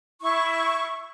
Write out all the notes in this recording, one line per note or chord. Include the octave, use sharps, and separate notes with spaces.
E4 C#6